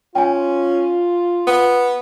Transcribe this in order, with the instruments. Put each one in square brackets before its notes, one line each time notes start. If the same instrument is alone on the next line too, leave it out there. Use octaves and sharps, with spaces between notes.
[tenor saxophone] C#4 [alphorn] F4 [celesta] G5 G#5
[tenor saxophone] B3